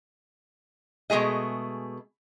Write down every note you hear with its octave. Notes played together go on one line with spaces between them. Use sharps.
B2 G#3 A3 G#4 D#5